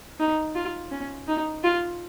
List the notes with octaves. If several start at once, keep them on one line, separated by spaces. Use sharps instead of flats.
D#4
F4
C#4
D#4
F4